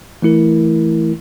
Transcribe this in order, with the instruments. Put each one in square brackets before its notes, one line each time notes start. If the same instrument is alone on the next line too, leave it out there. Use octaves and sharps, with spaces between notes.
[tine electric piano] E3 A3 E4 A#4